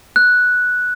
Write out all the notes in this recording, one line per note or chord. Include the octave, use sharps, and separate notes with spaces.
F#6